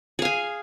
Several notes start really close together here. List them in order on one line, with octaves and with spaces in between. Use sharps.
G#4 F5 G#5